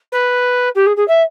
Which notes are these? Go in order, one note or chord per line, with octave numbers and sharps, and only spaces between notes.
B4
G4
G#4
G#4
E5